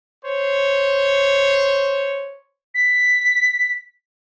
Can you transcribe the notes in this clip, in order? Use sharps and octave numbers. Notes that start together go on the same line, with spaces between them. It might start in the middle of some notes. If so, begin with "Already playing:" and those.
C5 C#5
B6